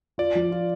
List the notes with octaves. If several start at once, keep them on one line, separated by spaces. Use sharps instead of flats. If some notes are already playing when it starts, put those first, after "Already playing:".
F4 D5
F3
F4